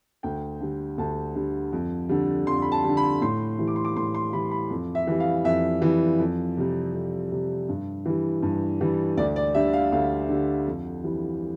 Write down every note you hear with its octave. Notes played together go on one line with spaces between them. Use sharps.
D2 G5
D3 G3
D2 A5
D3 G3
F2
D3 G3
F2 C6
B5
A5
D3 G3
B5
A2 C6
E3 G3
D6
C6
D6
A2 C6
C6
E3 G3 B5
B5
F2
E5
E3 G3
F5
F2 E5
E3 G3
F2
C3 G3
F2
C3 G3
G2
E3 G3
G2
E3 G3
D2 D5
D5
D3 G3 E5
F5
D2 F5
D3 G3
F2
E3 G3